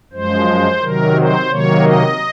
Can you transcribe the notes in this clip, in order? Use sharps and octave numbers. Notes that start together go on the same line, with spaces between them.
F#2 F3 G#3 C5
C3 D#3 F#3 A#4
C5
C3 D#3 F#3 A#3 C#5
D#5